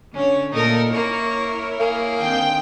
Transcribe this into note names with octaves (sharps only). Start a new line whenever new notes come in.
D3 C#4 C#5
A#2 A3 D#4 A4 A#4
A#3 E4 A#4 C#5 C#6
A#3 G#4
D3 D#3 C4 G5